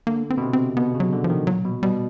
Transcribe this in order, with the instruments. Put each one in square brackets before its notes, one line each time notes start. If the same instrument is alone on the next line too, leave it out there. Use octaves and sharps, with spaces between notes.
[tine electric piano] D3 [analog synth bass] A#3
[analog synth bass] C4
[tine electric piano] B2
C3
[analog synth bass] C4
[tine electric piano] B2 [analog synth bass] B3
[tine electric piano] C#3
[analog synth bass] F#3
[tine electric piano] D3
[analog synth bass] F3
[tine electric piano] D#3
[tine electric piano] A#2 [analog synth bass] F#3
[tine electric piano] B2
[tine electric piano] B2 [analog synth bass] G3